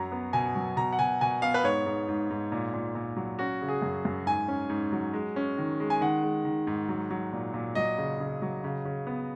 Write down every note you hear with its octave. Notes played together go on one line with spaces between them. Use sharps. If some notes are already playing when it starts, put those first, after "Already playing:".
Already playing: F#2 F#3 A#5
B3
B2 G#5
F#3
B2 A#5
F#5
B2 G#5
B2 G#5
B3 F5
B4
G#2 C#5
G#2
G#2
G#2
A#2
A#2
A#2
F#3
C#4 F#4
C#3
G#4
F#2
F#2
G#2 G#5
C#4
G#2
F#3
G#3
C#4
D#3
G#3
G#5
D#3 F#5
G#3
D#3
G#2
F#3
F#3
A#2
A#2
F#3 D#5
C#3
C#3
F#3
C#3
C#3
B3